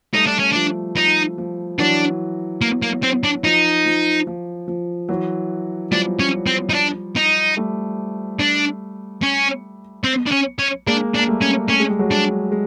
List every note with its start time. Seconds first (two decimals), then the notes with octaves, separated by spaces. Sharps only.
0.14 G3 A3 D#4
0.26 D4
0.39 C#4
0.52 F3 D4
0.96 F3 D#4
1.38 F3
1.79 E3 F#3 D4
2.62 A#3
2.82 A#3
3.03 C4
3.24 D4
3.44 F3 D#4
3.86 F3
4.27 F3
4.68 F3
5.09 E3 F#3
5.92 F3 G3 D4
6.20 C#4
6.47 C4
6.69 D#4
6.74 D4
7.16 D#4
7.57 G3 A3
8.39 D4
9.22 C#4
10.04 C4
10.27 D4
10.32 C#4
10.59 C#4
10.87 G#3 A#3 D4
11.15 D4
11.19 A#3
11.28 G3 A3
11.42 C#4
11.69 A3 C#4
11.80 G#3
11.90 G3
11.99 F#3 G#3
12.11 D4
12.52 G#3